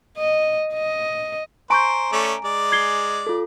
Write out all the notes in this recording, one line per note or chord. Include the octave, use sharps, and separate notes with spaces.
D#5
D#5
C5 G#5 A#5 C6 C#6 G6 D7
A3 C#4 D5
G#3 D5
G#6 C7 G7
F4 A4